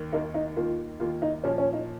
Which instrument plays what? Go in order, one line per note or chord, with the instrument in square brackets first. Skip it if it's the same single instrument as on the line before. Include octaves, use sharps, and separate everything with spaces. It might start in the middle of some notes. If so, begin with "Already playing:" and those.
Already playing: [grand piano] D#2 D#3 A#3
[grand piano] D#2 D#3 A#3 [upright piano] D#4
[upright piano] D#4
[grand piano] D#2 D#3 A#3 [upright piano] F4
[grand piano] D#2 D#3 A#3 [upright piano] F4
[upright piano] D#4
[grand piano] A#2 F3 A#3 [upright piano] C#4
[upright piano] C#4
D#4